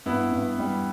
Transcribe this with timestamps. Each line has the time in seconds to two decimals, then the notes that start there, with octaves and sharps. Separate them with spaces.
0.06 G2 B3 E4
0.32 G2
0.59 G3